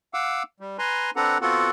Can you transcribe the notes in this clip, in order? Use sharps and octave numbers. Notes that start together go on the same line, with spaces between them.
F5 F#5 D6 E6
G3
B4 G#5 A#5 C6
C4 D4 A4 B4 F#5 A#5
B3 C4 F4 F#4 A4 F#5